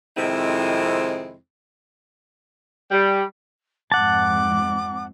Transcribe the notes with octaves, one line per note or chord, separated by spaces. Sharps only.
F2 C3 D#3 G#3 C4 E4
G3
F2 G#2 C4 F#5 A5 D6